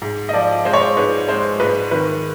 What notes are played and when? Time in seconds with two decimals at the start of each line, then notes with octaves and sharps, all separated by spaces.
0.02 G#2
0.29 D#5
0.33 F3 D5
0.65 G#3 C5
0.73 C#5
0.82 C5
0.97 G#2 B4
1.28 G#3 C5
1.60 G#2 B4
1.91 D#3 B4